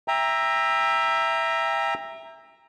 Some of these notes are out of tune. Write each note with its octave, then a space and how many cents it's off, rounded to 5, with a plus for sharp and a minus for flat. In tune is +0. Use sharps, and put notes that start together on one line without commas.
E5 +0 G5 +35 A#5 +0